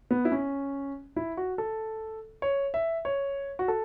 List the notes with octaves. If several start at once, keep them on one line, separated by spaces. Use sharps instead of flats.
B3
E4
C#4
E4
F#4
A4
C#5
E5
C#5
F#4
A4